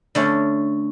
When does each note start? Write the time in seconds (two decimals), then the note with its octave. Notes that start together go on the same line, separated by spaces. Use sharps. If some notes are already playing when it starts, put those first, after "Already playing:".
0.15 D3 A3 C#4